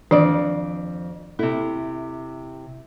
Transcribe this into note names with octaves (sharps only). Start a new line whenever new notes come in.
F2 D#3 E3 D4 D5
C3 E4 A4